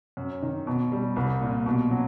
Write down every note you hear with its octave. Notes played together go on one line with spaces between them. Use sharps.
F#2
D#3
B2
G3
C2
A#2
B2
F#3